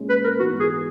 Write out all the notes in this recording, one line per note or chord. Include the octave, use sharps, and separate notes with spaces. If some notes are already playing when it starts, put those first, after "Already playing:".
Already playing: A#2 G#3 C#4
B4
A#4
G#2 E3 B3 F#4
G#4